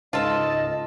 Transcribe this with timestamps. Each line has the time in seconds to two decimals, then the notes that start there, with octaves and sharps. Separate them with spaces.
0.13 C#2 G#2 F4 A4 D#5 A5